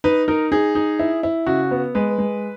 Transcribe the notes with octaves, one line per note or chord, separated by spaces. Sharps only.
D#4 B4
D#4 A#4
D#4 G#4
D#4
E4
E4
C#3 F#4
B3
G#3 B4
G#3